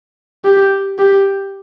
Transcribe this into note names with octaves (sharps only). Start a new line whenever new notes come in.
G4
G4